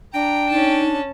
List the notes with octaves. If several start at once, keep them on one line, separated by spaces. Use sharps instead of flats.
D4 G5 A#5
C#4 D#4 A5